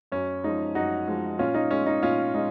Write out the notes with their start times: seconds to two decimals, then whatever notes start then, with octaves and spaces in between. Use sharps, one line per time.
0.12 F#2 C#4
0.44 F3 G#3 D#4
0.75 F#2 D#4 F#4
1.08 F3 G#3
1.39 A#2 C#4 F4
1.54 D#4
1.71 G#3 C#4
1.86 D#4
2.02 A#2 C#4 F4
2.34 G#3 D#4